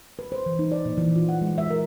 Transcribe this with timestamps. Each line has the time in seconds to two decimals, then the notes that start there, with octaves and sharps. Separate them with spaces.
0.19 B4
0.32 C5
0.46 E3
0.59 D#4
0.72 D5
0.85 A#2
0.98 E3
1.16 F4
1.29 F#5
1.42 G#3
1.58 E5
1.70 A#4